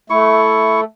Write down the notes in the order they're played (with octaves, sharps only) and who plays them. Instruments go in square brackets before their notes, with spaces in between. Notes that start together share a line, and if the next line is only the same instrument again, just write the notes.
[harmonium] A3 [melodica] E4 C#6